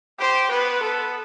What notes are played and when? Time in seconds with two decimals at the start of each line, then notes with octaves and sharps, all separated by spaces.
0.20 G4 C5
0.51 B3 B4
0.82 A4